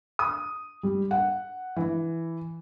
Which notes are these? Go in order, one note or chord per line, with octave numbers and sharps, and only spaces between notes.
D#6
G3
F#5
E3